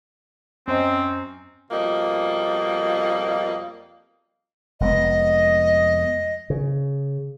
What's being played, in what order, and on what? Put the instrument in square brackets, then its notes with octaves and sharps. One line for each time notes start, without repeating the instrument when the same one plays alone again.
[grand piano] F#2 C5 D#5 [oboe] C4
[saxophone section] F2 B2 G3 A#3 F4 D#5
[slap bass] F1 G#3 B3 [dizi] D#5
[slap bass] C#3